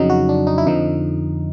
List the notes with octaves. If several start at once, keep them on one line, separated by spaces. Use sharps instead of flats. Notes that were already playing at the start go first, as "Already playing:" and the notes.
Already playing: F2 C#3 F#3 D#4
F#4
D4
D#4
E4
F2 D3 F3 D#4